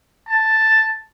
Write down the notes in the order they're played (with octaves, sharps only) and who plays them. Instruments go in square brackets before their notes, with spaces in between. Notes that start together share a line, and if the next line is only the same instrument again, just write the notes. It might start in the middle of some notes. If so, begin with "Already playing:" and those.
[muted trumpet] A5